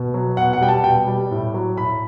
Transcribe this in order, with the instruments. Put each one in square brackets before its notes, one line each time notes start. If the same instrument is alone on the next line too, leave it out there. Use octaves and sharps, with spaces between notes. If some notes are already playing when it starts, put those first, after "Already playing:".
Already playing: [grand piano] B2
F#3
B2 F#5
F#5
G3 G5
A5
B2 G5
G3
A2
F#3
A2 B5